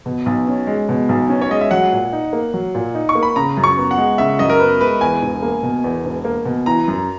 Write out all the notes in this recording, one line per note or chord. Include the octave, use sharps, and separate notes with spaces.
B2
B1
C#4
G#3
B2
B1
C#4
C#5
G#3 D#5
E5
F#3 F#5
A#2
D#4
A#3
F#3
A#2
D#4
C#6
A#3
B5
C#3 A#5
F#2
C#6
B3
F#5
G#3
C#3 E5
F#2 D#5
A#4
B3 B4
G#3 B4
E2 G#5
E1
A#3
B2
E2
E1
A#3
B2
E3 A#5
F#2